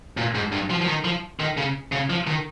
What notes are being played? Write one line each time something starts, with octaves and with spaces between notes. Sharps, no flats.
A#2
G#2
G2
F3
F3
D#3
F3
D#3
C#3
C#3
F3
D#3